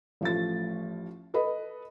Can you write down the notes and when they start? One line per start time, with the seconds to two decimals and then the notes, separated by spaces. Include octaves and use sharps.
0.21 A1 F3 A3 A6
1.34 A4 B4 D#5 B5